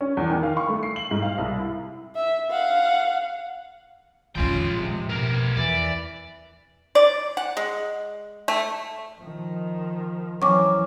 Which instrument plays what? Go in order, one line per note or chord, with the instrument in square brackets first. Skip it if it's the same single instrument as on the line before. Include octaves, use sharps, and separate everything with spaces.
[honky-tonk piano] C#4
E2
D#3
F5
C#6
A3
C7
F#7
G#2
F5
C2
E4
[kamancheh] E5
F5 F#5
[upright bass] A#1 F2 [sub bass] D#3 [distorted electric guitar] G#3 G5 [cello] C#4 F4
[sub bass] A2 [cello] C3
[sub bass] B2 [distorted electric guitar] B3 A#4
[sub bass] E2 [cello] E3 [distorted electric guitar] D5
[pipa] D5
F#5
G#3
A3
[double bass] D#3 F3
[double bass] E3 [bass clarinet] F#3 [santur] C4 C#4 [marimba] C#6 D6